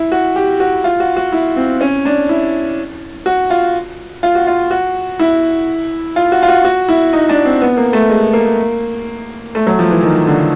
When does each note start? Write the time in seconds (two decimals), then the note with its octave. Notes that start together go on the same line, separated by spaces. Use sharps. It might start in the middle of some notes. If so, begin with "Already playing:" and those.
Already playing: E4
0.12 F#4
0.36 G4
0.60 F#4
0.84 F4
1.00 F#4
1.16 F#4
1.32 E4
1.56 C4
1.81 C#4
2.05 D4
2.29 E4
3.26 F#4
3.50 F4
4.23 F4
4.35 F#4
4.47 F4
4.71 F#4
5.19 E4
6.16 F4
6.32 F#4
6.43 F4
6.48 F#4
6.65 F#4
6.88 E4
7.13 D#4
7.29 D4
7.45 C4
7.62 B3
7.77 A#3
7.93 A3
8.09 G#3
8.33 A#3
9.55 A3
9.67 F#3
9.79 F3
9.91 E3
10.03 D#3
10.27 D3